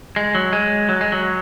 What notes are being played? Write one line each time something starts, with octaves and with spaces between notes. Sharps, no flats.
G#3
F#3
G#3
F#3
G#3
F#3